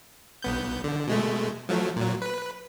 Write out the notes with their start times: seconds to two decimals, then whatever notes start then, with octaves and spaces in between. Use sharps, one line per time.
0.42 B1 B3 G6
0.84 D3
1.08 B2 G#3 A3
1.69 F3 F#3 A3
1.96 A#2 F#3
2.22 B4